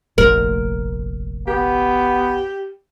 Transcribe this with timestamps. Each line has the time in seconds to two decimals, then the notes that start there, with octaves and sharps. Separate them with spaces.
0.18 F1 A#1 A#4
1.48 B3 G4